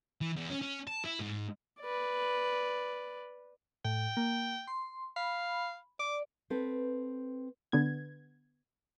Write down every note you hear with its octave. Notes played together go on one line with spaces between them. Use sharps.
E3
E2
C#4
C#4
A5
E4
G#2
B4 D5
A2 G5
A#3
C6
F5 B5
D5 D6
C4 A4 B4
D3 B3 G#6